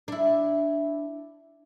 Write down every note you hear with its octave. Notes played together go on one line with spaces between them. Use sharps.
D4 E4